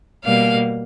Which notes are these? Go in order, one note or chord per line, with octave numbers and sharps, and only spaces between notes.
B2 G3 A#3 F5